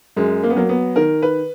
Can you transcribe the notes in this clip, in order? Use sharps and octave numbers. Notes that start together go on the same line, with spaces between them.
F#2 G#3
A#3
B3
F#3 A#3
B3
D#3 A#4
B4